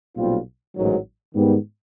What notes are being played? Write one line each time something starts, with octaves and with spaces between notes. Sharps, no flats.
B1 A#2 G3 C4 F4
A1 G#2 D#3 F#3
G#2 D#3 G3 B3